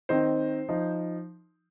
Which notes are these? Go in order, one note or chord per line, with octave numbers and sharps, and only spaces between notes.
D#3 C4 D#4 C5
F3 D#4